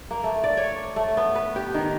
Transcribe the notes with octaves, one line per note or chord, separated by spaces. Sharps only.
A#3
A3
D5
C#5
A3
B3
B4
G4
D#3